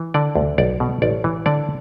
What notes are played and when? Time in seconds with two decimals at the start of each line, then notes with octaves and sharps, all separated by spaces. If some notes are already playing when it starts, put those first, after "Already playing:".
Already playing: E3
0.14 D3 D5
0.35 D2
0.58 B1 D5
0.80 B2
1.02 A1 D5
1.24 E3
1.46 D3 D5